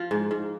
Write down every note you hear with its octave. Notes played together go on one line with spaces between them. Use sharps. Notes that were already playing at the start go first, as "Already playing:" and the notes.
Already playing: F3 F4
G#2
G#2